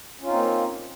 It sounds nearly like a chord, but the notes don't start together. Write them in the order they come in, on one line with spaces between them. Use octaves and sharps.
C#4 F4 D#4 C4 A#3